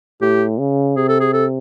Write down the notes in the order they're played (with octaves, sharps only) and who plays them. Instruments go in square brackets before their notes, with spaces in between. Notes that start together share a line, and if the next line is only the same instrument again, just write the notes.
[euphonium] A2 [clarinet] G4
[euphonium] C#3
[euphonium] C3 [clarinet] G#4
[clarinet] A4
G#4
A4